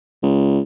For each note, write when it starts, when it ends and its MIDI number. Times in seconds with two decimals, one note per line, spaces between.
0.23 0.60 37